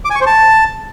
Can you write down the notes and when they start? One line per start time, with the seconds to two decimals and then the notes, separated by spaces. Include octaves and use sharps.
0.05 D6
0.10 G#5
0.16 C#6
0.21 C5
0.26 A5